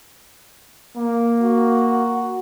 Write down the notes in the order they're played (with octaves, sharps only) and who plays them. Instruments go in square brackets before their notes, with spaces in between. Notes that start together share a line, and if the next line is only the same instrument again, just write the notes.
[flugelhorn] A#3
[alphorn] F#4